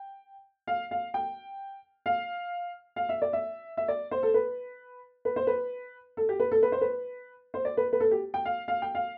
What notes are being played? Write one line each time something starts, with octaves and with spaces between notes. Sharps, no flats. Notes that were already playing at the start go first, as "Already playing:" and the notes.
Already playing: G5
F5
F5
G5
F5
F5
E5
D5
E5
E5
D5
C5
A4
B4
B4
C5
B4
A4
G4
B4
A4
B4
C5
B4
C5
D5
B4
B4
A4
G4
G5
F5
F5
G5
F5